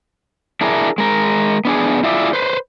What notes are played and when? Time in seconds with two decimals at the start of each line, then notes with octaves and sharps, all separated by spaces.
0.61 D4 E4 G#4 A#4
0.98 G#3 A#4
1.65 B3 D4 G#4
2.04 E4 F4 G#4 D5 E5
2.33 B4 C5